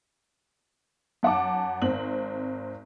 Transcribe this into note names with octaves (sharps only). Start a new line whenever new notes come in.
F#2 F#5 A5 D6
G#1 C4 F#7